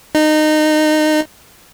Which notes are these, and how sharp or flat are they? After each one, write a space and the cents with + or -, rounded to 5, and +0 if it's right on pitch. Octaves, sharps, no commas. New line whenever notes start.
D#4 -20